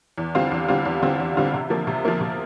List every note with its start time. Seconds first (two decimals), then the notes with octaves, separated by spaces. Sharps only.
0.18 E2
0.35 D3 G3 C4 F4
0.51 E2
0.68 D3 G3 C4 F4
0.85 E2
1.02 D3 G3 C4 F4
1.19 E2
1.37 D3 G3 C4 F4
1.54 C3
1.70 F3 A#3
1.87 C3
2.05 F3 A#3
2.21 C3